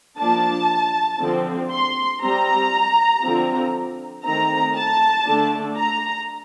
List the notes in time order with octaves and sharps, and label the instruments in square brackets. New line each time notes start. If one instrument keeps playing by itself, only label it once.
[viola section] F3 A#3 D4 A5
D3 F3 C4
C6
G3 C4 A#5
D3 F3 C4
D#3 A3 C4 A#5
A5
D3 A3 D4
A#5